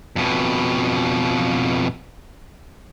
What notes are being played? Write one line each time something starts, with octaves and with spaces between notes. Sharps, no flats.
F2 B2